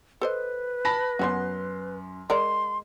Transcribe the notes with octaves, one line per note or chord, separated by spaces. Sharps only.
A4 B4 C5 D#5
A5 B5 A#6
F#2 B3 C#4 F#4 C6
G#3 A#4 D5 C6